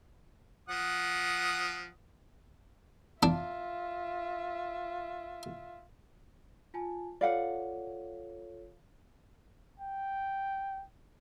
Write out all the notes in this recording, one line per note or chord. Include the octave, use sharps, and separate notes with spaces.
F3 F#5 D#6
D4 F4 E5
F4 G#5 A5
F4 A4 C#5 D5 F5 F#5
G5